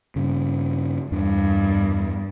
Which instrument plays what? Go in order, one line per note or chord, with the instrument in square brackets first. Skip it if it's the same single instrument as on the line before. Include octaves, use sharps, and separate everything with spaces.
[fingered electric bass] G2 C#3
[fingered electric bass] E2 D4 [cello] G2